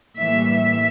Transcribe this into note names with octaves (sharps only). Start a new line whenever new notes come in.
A2 E3 G3 A#3 E5
E5